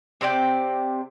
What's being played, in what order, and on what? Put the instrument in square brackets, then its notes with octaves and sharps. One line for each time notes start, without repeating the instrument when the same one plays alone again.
[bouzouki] C3 C4 D5 G5